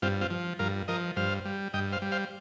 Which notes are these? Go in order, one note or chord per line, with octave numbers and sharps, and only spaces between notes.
G2 C4 F4
C4 F4
F3
G2 F4 A#4
F3 A#4 D#5
G2 C5 F5
G3
G2 D#5 G5
C5 F5
G3
C5 F5